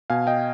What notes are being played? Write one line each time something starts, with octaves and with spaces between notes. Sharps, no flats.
B2 F5 G#5
D#5 G5